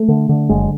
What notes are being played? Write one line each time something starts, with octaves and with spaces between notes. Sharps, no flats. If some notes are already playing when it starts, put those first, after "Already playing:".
Already playing: A3
D3
D3
F#1 G#3